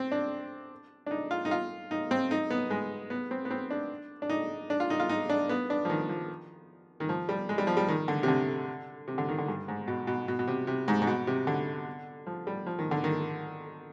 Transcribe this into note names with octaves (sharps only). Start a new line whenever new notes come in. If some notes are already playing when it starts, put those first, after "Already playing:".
Already playing: C4
D4
D4
D#4
F4
D#4
F4
D#4
C4
D#4
B3
G#3
B3
C4
B3
C4
D4
D4
D#4
D4
F4
D#4
F4
D#4
D4
B3
D4
F3
D#3
F3
D#3
F3
G3
G#3
G3
F3
G3
D#3
D3
C3
D3
C3
D3
D#3
D3
G2
G#2
B2
B2
B2
B2
C3
C3
G#2
G#2
B2
C3
D3
F3
G3
F3
D#3
D3
D#3